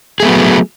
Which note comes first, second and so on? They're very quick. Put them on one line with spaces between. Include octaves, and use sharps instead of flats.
G#4 A3 B3 F#3